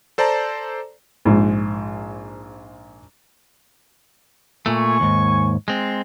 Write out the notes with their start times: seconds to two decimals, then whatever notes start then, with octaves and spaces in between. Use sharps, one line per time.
0.18 A4 C5 D5 A5 A#5
1.25 A#1 G#2
4.66 A#2 A3 G#5 C#6
5.00 D#2 G#2
5.68 G#3 C4